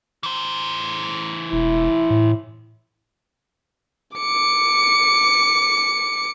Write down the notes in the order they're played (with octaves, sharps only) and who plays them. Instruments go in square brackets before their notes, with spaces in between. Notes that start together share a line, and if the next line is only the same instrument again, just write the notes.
[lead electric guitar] E3 C5
[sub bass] E1 [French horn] E4
[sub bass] A2
[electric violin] D6 C#7